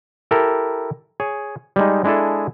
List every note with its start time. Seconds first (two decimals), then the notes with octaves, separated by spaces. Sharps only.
0.31 E4 G4 A4 A#4
1.20 G#4 C#5
1.76 G3 G#3 D#4
2.04 G#3 D4 E4 G#4 A4